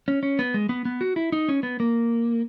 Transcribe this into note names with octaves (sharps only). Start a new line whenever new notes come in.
C#4
C#4
B3
G#3
B3
B3
F#4
E4
D#4
C#4
B3
A#3